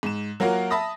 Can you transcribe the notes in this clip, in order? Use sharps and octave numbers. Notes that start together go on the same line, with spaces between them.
G#2 E7
F#3 A#3 F4 F#4 A#4
E5 A5 B5 D#6 A#6